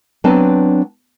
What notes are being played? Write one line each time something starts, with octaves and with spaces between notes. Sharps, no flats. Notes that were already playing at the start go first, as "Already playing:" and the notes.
F#3 B3 C4 D4 B4 A5